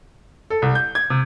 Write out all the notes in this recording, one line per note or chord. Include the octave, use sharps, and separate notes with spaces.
A4
C2
G6
G#6
C3